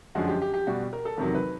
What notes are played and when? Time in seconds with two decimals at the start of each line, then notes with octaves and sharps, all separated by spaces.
0.15 F#2 D3 F3 G#3 F#4
0.28 G4
0.42 G4
0.54 G4
0.67 B2 G3 F#4
0.93 A#4
1.05 A4
1.18 E2 C3 D#3 F#3 A#4
1.35 B4